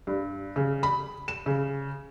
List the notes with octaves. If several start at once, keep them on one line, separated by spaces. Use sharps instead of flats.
G2
C#3
B5
E7
C#3